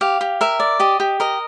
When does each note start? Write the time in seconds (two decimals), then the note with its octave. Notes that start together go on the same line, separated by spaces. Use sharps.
0.01 G4 F5
0.21 G4
0.41 A#4 E5
0.60 D5
0.80 G4 D#5
1.00 G4
1.20 A#4 D#5